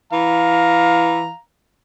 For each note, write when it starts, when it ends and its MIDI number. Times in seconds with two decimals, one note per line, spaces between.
0.13 1.30 52
0.13 1.40 77
0.13 1.38 82